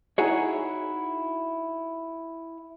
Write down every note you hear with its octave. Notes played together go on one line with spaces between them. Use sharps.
D#4 E4 F#4 G#4 C#5